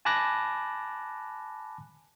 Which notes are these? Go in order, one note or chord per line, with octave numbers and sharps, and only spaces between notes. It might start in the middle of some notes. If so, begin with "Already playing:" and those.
G#5 A5 B5 D6 F#6 A#6